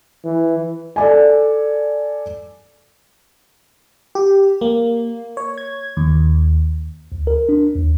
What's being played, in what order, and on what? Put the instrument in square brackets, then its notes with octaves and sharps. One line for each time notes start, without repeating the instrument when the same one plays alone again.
[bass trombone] E3
[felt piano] A4 D5 G#5
[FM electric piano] G4
A#3
C#5
G#6
D#2
[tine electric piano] D2
A#4
D4
D#2